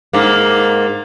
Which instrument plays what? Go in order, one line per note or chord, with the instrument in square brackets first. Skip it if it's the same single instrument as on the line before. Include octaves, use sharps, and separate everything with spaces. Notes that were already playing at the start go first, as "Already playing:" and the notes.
[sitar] G#2 A#3